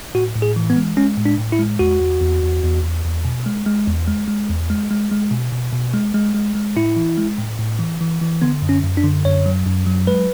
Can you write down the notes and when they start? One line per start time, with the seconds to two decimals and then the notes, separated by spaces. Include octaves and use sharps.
0.15 A2 F#4
0.35 A2
0.42 G#4
0.56 E3
0.70 B3
0.76 G#3
0.97 G#3 C#4
1.18 A2
1.26 D4
1.38 A2
1.52 E4
1.59 G#3
1.79 E2 F#4
2.00 E2
2.21 E2
2.43 E2
2.63 E2
2.83 E2
3.05 E2
3.25 B2
3.46 G#3
3.66 G#3
3.87 E2
4.08 G#3
4.28 G#3
4.49 E2
4.70 G#3
4.91 G#3
5.12 G#3
5.31 B2
5.52 B2
5.72 B2
5.94 G#3
6.14 G#3
6.35 G#3
6.55 G#3
6.76 A2 E4
6.96 E3
7.18 G#3
7.39 A2
7.59 A2
7.79 E3
8.01 E3
8.22 E3
8.42 D3 B3
8.62 F#2
8.69 C#4
8.84 F#2
8.97 D4
9.04 D3
9.25 F#2 C#5
9.46 F#3
9.66 F#2
9.86 F#3
10.07 G#3 B4